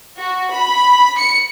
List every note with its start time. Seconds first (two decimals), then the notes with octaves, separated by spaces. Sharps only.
0.17 F#4
0.51 B5
1.17 C#7